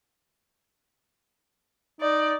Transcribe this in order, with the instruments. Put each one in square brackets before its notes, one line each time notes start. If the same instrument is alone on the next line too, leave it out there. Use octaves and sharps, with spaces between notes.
[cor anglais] D#4 [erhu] D5